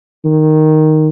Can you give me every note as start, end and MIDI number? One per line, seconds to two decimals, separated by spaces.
0.25 1.08 51